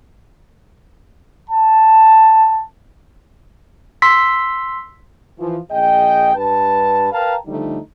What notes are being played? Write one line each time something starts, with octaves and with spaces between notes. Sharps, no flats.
A5
C6 E6 B6
E3 F3
A#1 G#4 D#5 G5
G2 B4 A5
A#4 B4 F5 G5 A5 A#5
D3 F3 G3 A3 D#4